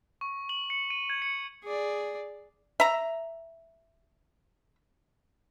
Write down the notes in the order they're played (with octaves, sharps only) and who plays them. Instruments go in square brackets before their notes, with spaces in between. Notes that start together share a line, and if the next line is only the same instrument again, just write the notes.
[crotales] C#6
F#7
C#7
D#7
G#6
C#7
[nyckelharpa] G#4 D5
[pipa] E5 A#5